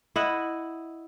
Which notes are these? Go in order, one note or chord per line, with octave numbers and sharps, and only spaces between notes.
E4 D#5 F#5